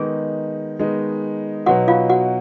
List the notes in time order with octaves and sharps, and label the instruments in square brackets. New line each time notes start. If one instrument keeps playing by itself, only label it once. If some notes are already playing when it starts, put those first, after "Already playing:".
Already playing: [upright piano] D#3 G#3 B3 D#4 [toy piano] G#4
[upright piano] D#3 G#3 B3 D#4
[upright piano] B2 F#3 B3 D#4 [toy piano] F#4 F#5
[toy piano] F4 F5
F#4 F#5